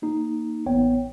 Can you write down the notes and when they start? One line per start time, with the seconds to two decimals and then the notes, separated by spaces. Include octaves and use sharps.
0.02 A#3 D#4
0.66 A1 B3 C#5 G5